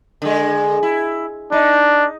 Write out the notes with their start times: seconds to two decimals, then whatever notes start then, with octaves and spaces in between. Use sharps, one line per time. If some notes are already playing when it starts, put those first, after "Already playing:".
0.22 D3 G#3
0.83 E4
1.52 D4 D#4